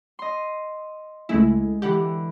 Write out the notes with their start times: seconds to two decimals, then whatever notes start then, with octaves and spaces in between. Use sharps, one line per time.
0.19 D#5 C6
1.29 C#2 G#3 A3 E4
1.82 D3 E3 G4 F#5